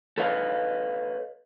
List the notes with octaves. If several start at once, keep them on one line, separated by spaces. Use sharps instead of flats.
A4 B4 C#5 D#5 F5